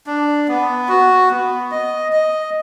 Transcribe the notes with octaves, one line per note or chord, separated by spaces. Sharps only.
D4
B3
F#4
B3
D#5
D#5